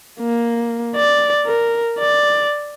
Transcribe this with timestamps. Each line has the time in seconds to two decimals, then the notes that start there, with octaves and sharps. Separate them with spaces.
0.20 A#3
0.96 D5
1.46 A#4
1.99 D5